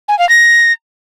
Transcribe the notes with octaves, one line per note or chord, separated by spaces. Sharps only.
G#5
F5
A#6